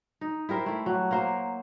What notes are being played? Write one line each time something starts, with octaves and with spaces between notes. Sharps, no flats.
D#4
E4 G4 A#4 C5
A3 E4
F#3
A#3 A#4 C5